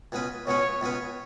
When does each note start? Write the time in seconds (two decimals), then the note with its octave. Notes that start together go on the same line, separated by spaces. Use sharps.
0.12 C#2 B2 G#3 C#4 B4
0.47 C#2 B2 G#3 C#4 B4 C#5
0.81 C#2 B2 G#3 C#4 B4